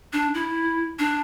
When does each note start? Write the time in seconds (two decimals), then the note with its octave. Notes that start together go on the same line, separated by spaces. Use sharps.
0.13 D4
0.34 E4
0.99 D4